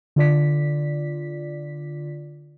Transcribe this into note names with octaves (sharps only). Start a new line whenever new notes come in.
D3 F4 D5 B6